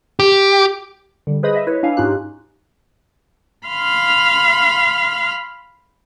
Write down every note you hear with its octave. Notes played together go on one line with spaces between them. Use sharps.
G4
D3 G3
G#4 B4 C5 D#5 B5 D#6
D#5 E5
E4 B4 C#5
D4 E4 F5 G#5
G#2 C#4 D#4 F4 G4 F#6
F5 B5 C6 F6